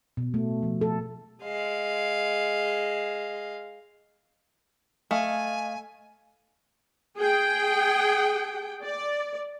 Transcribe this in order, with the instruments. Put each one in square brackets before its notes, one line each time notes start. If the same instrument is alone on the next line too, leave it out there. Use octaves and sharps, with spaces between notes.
[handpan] B2
A3
F3
A4
[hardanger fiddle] G#3 F5
[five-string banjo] A3 [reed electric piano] D#5 F5 [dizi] G#5
[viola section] G#4 G5
D5